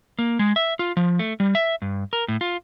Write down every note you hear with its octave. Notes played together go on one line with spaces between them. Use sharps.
A#3
G#3
E5
F4
F3
A3
G3
E5
G2
A#4
A2
F4